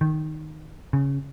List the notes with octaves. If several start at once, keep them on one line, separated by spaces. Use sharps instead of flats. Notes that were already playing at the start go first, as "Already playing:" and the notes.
D#3
C#3